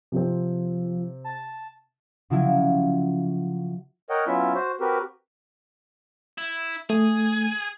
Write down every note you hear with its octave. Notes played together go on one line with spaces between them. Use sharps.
C3 F3 C4
A5
C#3 F3 F#3 E4
A#4 C#5 D#5 F#5 G5
F#3 B3 C#4 E4 F4 E5
F#4 C5
C4 F#4 G4 A#4 B4
E4
A3 G#4